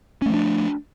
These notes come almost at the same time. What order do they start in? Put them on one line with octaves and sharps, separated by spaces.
C#4 A3 F3 D4